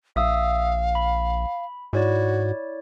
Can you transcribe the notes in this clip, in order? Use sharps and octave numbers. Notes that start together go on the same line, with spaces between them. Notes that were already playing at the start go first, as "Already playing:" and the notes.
A#1 E5 F5 D#6 E6
B5
G#2 E4 F#4 C#5 D5